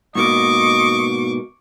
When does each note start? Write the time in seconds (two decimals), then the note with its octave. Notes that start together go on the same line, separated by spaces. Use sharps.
0.15 G#2 B2 A#3 D#5 C#6 D6